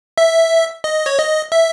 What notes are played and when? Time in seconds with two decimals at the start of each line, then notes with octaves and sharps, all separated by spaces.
0.18 E5
0.84 D#5
1.06 C#5
1.18 D#5
1.52 E5